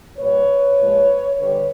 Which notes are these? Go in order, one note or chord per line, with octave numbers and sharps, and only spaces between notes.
A#2 G3 B4 C#5
A#2 F3 G#3
D3 G3 B4 C#5